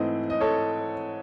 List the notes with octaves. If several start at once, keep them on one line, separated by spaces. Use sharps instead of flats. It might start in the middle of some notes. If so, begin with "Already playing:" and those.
Already playing: G#2 E3 A3 C4 D#5
D#5
A4 C#5